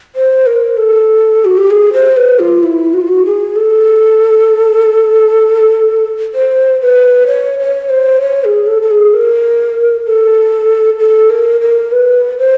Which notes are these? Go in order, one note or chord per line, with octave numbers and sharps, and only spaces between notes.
C5
A#4
A4
F#4
G4
G#4
C5
B4
F4
E4
F#4
F4
F#4
G#4
A4
C5
B4
C#5
C#5
C5
C#5
G#4
A4
A4
G#4
A#4
A4
A4
A#4
A#4
B4
C5